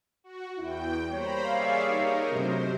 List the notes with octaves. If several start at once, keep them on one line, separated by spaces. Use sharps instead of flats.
F#4
E2 E4 G5
G3 A#3 C5 C#5 A#5 B5
G#4 D5 E5 F5
D#4 A#4
C3 F#3 A3 D4 G4 C5